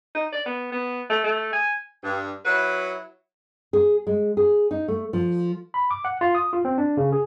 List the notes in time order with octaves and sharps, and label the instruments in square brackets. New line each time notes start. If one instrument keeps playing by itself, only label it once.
[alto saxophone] D#4
D5
B3
B3
A3
A3
G#5
[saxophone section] G2
F#3 E4 F#4 B4
[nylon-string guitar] G#4
G#3
G#4
D#4
A3
F3
[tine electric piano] B5
D6
F#5
F4
D#6
F4
C4
D4
C#3
G#4